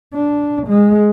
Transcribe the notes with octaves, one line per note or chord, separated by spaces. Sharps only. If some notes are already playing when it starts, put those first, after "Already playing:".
D4
G#3